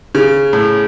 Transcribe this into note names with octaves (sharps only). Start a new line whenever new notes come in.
C#3
A2